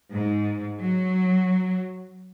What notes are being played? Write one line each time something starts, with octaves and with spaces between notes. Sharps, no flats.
G#2
F#3